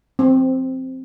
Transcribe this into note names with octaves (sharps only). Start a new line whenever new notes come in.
C4